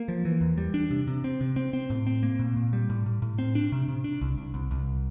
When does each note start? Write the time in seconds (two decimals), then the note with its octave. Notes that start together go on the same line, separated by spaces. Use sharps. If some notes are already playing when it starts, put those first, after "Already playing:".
Already playing: A#3
0.08 F3
0.25 E3
0.41 E2
0.58 G3
0.74 D4
0.91 C3
1.08 C3
1.24 C4
1.41 C3
1.56 C4
1.73 C4
1.90 A2
2.07 C4
2.23 A#3
2.39 A#2
2.56 A#2
2.73 G3
2.90 A2
3.06 A2
3.22 A2
3.38 C4
3.55 D4
3.72 C3
3.88 C3
4.04 D4
4.21 C2
4.38 C2
4.54 C2
4.71 C2